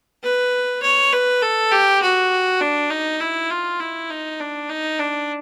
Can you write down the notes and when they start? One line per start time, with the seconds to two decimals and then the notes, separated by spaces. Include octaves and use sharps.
0.23 B4
0.82 C#5
1.13 B4
1.42 A4
1.71 G4
2.02 F#4
2.60 D4
2.90 D#4
3.20 E4
3.50 F4
3.79 E4
4.10 D#4
4.39 D4
4.69 D#4
4.99 D4